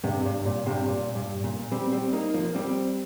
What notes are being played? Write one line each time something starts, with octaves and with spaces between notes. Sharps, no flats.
G2 C3
G2
A#2
G2 C3
A#2
G2
A#2
G3 C4
G3 C4
A#3 D#4
F3 A#3
G3 C4